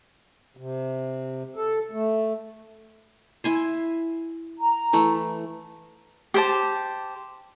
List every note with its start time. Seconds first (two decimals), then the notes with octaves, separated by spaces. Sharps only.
0.57 C3
1.56 A4
1.91 A3
3.44 E4 G#5 C6
4.60 A#5
4.93 E3 A3
6.34 G4 C5 A5